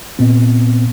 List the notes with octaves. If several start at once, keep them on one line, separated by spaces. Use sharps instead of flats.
A#2 B3 C4